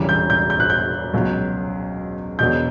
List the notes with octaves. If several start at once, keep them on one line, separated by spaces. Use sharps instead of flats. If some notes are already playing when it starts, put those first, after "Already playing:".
Already playing: E1 E2 C#3 E3 G3
G6
G6
G6
F#6
G6
C#2 B2 F#3
E1 E2 B2 G6